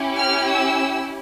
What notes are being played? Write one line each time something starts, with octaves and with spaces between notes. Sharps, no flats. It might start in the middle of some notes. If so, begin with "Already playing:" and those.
Already playing: C#4 E4 G4
F6
E6